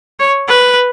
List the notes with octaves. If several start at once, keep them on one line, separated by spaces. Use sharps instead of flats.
C#5
B4